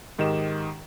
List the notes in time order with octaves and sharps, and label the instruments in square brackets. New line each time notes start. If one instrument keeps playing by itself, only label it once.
[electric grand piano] G#2 D#3 G4 D#5 E7